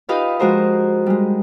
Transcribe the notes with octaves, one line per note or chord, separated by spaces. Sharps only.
D#4 F4 G4 B4 D#5 F5
F3 G#3 F#4 A#4 C5 D#5
G3 G#3